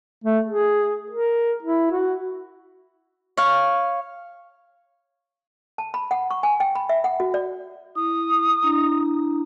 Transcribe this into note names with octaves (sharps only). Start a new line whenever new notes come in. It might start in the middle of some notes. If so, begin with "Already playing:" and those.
A3
G#4
A#4
E4
F#4
C#5 F5
A5
B5
F#5
C#6
G#5
G5
B5
E5
F#5
F#4
D5
E4 D#6
D4 E4 A#5